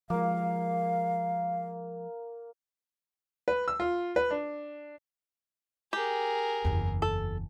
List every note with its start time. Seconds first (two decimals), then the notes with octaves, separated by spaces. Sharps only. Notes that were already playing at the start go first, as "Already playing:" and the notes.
0.10 F3 G#3 A#3 F5
3.48 B4
3.68 E6
3.80 F4
4.16 B4
4.31 D4
5.93 G4 G#4 A#4
6.65 F#1 E2
7.02 A4